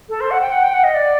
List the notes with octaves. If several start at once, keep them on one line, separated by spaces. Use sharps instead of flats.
A4
C5
F#5
G5
F#5
G5
F#5
D#5
D5